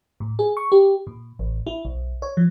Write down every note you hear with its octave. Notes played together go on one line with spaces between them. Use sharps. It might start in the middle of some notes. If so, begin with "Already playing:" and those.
A2
G#4
C#6
G4
A#2
A1
E4
B1
C#5
F3